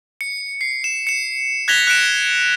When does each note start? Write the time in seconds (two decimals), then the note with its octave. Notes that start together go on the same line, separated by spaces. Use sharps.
0.21 C#7
0.61 C7
0.84 E7
1.07 C#7 E7
1.68 F#6 G#6 A#6 B6 F7 G7
1.87 F#6 A#6 C#7 D7 E7